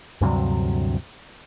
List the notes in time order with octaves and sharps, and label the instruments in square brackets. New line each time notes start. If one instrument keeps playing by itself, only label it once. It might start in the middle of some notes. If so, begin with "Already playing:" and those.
[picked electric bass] D2 G2 C3 F#3